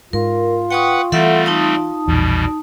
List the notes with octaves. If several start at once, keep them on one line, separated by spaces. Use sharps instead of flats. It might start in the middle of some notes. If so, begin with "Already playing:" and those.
G#2 F4 A#4
B4 F#5 G5 C#6 D#6
E3 G3 A3 C4 A4 E5 F#5
D#4 A5 D#6
A#1 E2 B2 G3